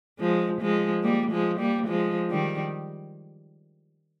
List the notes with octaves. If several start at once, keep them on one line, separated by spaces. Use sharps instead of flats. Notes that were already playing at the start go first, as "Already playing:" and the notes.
F3 G#3
F3 G#3
G3 A#3
F3 G#3
G3 A#3
F3 G#3
D#3 G3